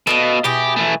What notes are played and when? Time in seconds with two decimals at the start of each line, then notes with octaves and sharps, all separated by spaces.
0.07 B2 A4 D#5 F5
0.44 B2 E4 G4 G#4
0.76 E3 A3